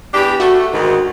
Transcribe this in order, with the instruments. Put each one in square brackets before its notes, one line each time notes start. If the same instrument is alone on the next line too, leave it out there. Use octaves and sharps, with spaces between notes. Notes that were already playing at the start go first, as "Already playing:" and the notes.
[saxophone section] E2 D4 G4
[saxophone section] A3 [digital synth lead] F#4
[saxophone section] D2 G#2 D#3